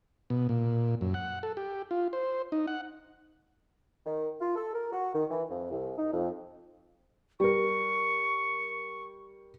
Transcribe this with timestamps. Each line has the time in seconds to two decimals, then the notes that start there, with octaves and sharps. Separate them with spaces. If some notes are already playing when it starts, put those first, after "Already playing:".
0.30 B2
0.49 A#2
1.01 F#2
1.14 F#5
1.43 A4
1.57 G4
1.91 F4
2.13 C5
2.52 D#4
2.67 F#5
4.05 D#3
4.40 F4
4.55 A4
4.74 A#4
4.91 F#4
5.14 D#3
5.29 E3
5.50 F2
5.71 C2
5.97 D#4
6.12 F2
7.40 G3 A#4 C#6